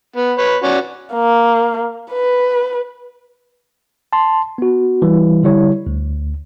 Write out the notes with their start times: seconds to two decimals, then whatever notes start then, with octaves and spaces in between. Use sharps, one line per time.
0.16 B3
0.38 B4 C#5
0.63 C#4 F#4 D5
1.13 A#3
2.13 B4
4.13 A5 C6
4.58 B3 F#4
5.02 E3 G3
5.43 D3 G3 E4 C#5
5.87 D2